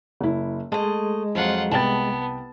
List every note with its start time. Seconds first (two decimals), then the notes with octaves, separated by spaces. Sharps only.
0.21 F#1 E4
0.72 G#3 A3 D#5 A5
1.35 F2 F3 F#3 F4 F#5
1.71 C2 B3 G5 A5 A6